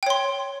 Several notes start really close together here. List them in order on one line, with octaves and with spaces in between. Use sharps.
G5 C#5 C6